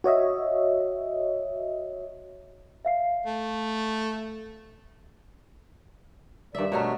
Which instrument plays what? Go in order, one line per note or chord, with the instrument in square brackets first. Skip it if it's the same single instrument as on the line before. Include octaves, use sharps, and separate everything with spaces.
[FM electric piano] F#4 C#5 D#5 E5
[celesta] E5 F5 C7
[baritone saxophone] A3
[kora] G2 E5 [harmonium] D#3 D5
[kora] B2 A3 A#4 [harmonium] D4 C#5